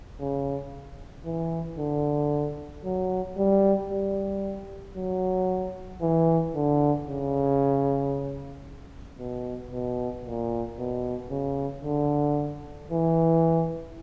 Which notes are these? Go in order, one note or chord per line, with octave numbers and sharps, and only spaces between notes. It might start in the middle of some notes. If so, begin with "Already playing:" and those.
C#3
E3
D3
F#3
G3
G3
F#3
E3
D3
C#3
B2
B2
A#2
B2
C#3
D3
E3